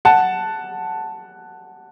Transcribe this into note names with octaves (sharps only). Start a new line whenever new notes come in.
F#5 A5